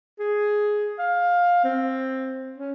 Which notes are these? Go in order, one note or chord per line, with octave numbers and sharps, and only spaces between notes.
G#4
F5
C4
C#4